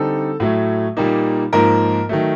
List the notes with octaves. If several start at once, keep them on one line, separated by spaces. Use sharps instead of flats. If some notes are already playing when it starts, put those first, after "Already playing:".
Already playing: D3 G3 C4 D#4 A4
A2 F#3 A3
A#2 G3 A#3 D#4
G#2 F3 A#3 A#4
D#3 F#3 A3